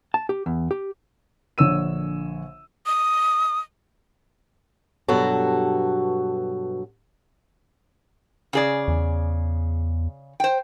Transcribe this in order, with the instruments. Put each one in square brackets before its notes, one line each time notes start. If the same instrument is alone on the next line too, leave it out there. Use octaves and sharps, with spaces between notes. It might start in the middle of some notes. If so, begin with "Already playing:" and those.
[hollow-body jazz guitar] A5
G4
E2
G4
[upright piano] A#1 D3 C#5 E6 D#7
[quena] D#6
[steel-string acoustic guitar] G2 B2 F#3 F#4 A4
[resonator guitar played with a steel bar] C#3 G#4 D5
[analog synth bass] E2
[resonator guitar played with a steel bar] C5 G5